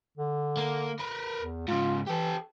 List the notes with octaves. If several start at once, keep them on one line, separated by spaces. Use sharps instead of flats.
D3
A#3
A#4 B4
E2
G#2 C#3 F4
E3 G4 A4